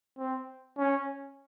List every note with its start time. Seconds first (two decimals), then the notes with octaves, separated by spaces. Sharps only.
0.18 C4
0.78 C#4